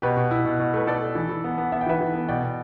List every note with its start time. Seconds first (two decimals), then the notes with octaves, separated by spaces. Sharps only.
0.02 B2 G4 B4
0.17 B2
0.31 E4
0.45 B2
0.60 B2
0.74 A3 B4
0.87 A3 A4 D5
1.02 A3
1.15 E3
1.29 E3
1.44 B3
1.58 B3
1.72 B3 E5
1.81 G5
1.86 E3 B4 E5
2.01 E3
2.15 B3
2.28 B2 D5 G5
2.42 B2